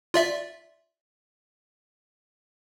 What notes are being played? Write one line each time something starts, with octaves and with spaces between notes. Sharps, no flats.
F4 D5 E5